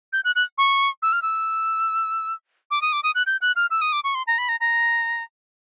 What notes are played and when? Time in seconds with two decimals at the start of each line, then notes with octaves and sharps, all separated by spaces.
0.13 G6
0.24 F#6
0.35 F#6
0.58 C#6
1.02 E6
1.13 F6
1.22 E6
2.71 D6
2.82 D#6
2.92 D6
3.03 D#6
3.15 F#6
3.26 G6
3.41 F#6
3.56 F6
3.70 E6
3.81 D#6
3.92 D6
4.04 C#6
4.15 C6
4.27 A#5
4.38 B5
4.49 A#5
4.60 A#5